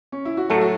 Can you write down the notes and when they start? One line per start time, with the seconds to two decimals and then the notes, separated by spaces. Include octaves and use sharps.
0.12 C#4
0.25 E4
0.37 F#4
0.50 A2 F#3 A3 A4
0.61 F#4